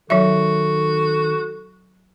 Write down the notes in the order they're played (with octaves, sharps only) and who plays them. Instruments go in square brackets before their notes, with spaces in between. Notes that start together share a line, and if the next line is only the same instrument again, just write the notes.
[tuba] D#3 [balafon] F#3 E5 [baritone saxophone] F#4 [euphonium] A4